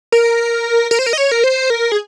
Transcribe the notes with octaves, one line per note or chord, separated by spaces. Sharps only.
A#4
A#4
C5
A#4
D#5
C#5
A#4
C5
A#4
G#4